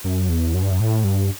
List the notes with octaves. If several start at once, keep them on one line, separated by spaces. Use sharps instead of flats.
F#2
E2
F#2
G2
F#2
A2
G2